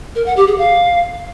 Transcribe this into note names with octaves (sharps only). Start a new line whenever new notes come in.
A#4
F#5
G4
G#4
F5